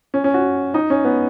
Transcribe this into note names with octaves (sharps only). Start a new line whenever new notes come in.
C#4
C#4
F#4
D#4
C#4
B3